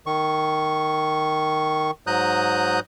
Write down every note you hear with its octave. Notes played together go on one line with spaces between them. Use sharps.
D#3 C#6
G#2 F#3 A#5 D#6 F#6 G6